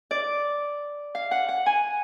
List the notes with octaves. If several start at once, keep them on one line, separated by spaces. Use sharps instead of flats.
D5
F5
F#5
F#5
G#5